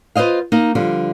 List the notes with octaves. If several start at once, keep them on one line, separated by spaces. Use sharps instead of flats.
F4 B4 C5 D#5 F5
A#3 D#4
D3 F3 G3